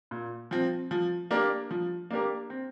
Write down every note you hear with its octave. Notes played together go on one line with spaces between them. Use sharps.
A#2
F3 C4
F3
A#3 D4 G4 A#4
F3
A#3 D4 G4 A#4
C4